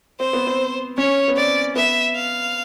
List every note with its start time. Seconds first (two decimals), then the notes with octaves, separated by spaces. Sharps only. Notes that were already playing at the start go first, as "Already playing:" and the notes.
0.20 C4 C5
0.33 B3
0.47 C4
0.98 C#4 C#5
1.28 B3
1.37 C4 D5
1.76 B3 E5
2.15 F5